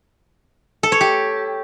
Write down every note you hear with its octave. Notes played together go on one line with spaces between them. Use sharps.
A4
C#5
G4